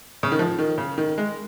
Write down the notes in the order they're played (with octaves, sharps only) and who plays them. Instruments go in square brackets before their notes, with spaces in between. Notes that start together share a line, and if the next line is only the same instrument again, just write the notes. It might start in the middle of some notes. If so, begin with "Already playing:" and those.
[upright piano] C#3
D#3
F3
D#3
C#3
D#3
G#3